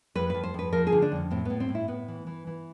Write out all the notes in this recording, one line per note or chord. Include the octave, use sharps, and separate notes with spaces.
F2 B4
F2 B4
C5
F2 B4
F3 A#4
G#4
D3
D4
F2 C#4
A2 C4
A2 B3
C4
A2
E4
A2 B3
E3
E3
E3